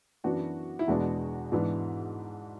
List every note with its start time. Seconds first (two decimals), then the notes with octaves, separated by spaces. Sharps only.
0.24 F#2 E3 B3 D4 F#4
0.79 E4
0.88 E2 B2 G#3 B3 D4 F#4
1.52 G#2 E3 B3 D4